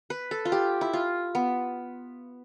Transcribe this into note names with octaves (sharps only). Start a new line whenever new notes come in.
B4
A4
F4
G4
E4
F4
B3